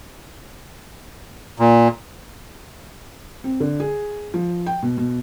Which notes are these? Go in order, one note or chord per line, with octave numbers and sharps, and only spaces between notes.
A#2
C4
D3
G#4
F3
G5
B2
B2